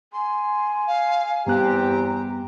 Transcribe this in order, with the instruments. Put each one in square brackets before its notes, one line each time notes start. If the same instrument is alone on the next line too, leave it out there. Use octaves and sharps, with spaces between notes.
[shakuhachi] G#5 [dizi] C6
[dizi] F5
[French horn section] E2 C4 G4 [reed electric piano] G2 B3 F#6 [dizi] A#5